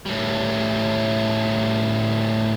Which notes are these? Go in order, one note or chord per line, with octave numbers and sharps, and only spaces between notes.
A2 G3